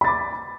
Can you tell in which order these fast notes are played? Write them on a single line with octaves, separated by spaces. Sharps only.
B5 A6 D6